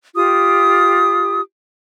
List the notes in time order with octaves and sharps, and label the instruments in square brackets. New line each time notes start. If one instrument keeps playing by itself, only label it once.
[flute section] F4 G4 D#6